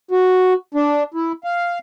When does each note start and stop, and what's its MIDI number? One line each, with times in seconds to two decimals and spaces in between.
0.11 0.53 66
0.74 1.03 62
1.14 1.32 64
1.44 1.79 77